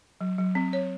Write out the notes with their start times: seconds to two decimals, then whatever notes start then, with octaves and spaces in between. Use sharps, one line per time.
0.21 F#3
0.38 F#3
0.55 C4
0.73 C#5